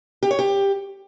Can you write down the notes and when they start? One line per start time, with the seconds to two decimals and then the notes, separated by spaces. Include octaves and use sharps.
0.23 G4
0.31 C#5
0.39 G4